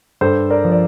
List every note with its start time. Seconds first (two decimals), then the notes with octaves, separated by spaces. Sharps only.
0.21 G2 A4 C5
0.50 A#4 D5
0.64 F3
0.72 D5